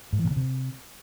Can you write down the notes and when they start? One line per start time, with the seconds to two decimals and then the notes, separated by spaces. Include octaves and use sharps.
0.13 G#2
0.19 E3
0.25 A#2
0.31 C#3
0.37 C3